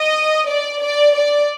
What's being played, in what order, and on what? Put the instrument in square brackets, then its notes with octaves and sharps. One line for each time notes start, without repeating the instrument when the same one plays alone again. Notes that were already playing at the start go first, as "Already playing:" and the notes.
Already playing: [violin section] D#5
D5
D5
D5